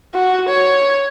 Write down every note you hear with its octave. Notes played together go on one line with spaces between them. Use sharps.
F#4
C#5